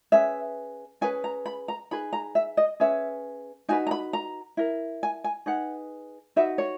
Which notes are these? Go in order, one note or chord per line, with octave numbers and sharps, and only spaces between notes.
C#4 G#4 B4 E5
C#4 G#4 B4 G#5
A#5
B5
A#5
D#4 G#4 B4 B5
A#5
E5
D#5
C#4 G#4 B4 E5
D#4 F#4 B4 G#5
A#5
B5
A#5
E4 A#4
G#5
G#5
D#4 G#4 B4 F#5
D#4 F#4 B4 E5
C#5